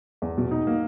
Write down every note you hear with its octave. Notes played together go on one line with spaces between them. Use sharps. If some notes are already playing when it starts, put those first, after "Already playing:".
E2
B2
D#4
A#3